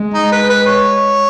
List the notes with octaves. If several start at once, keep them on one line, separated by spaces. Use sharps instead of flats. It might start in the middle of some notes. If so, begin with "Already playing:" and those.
Already playing: G#3
D#4
B4
B4
C#5